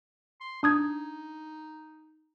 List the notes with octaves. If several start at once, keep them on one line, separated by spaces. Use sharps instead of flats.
C6
D4 D#4 D#6 G#6